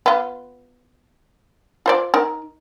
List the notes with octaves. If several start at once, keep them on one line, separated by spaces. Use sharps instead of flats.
B3 F4
F4 C5 D5
D#4 A#4